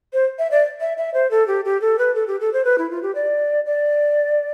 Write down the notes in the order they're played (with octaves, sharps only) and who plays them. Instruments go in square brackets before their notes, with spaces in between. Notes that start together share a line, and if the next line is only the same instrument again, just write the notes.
[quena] C5
E5
D5
E5
E5
C5
A4
G4
G4
A4
B4
A4
G4
A4
C5
B4
E4
F4
G4
D5
D5